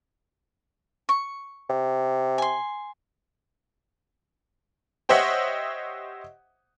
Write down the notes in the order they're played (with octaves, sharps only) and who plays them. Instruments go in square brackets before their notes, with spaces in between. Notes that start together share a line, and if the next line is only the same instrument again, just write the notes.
[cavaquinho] C#6
[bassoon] C3
[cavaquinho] G#5 C6
[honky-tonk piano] G4 C5 C#5 D#5 E5 F#5